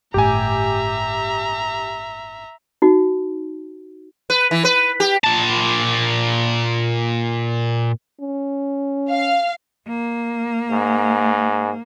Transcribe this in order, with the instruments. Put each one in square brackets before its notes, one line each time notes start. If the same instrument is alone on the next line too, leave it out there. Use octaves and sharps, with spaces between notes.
[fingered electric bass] G1 A2 [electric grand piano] G4 G#5 [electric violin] E5 A#5
[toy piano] D#4 F#4
[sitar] B4
E3
B4
G4
[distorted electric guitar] A#2 A5
[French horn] C#4
[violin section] F5
[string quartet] A#3
[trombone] G#2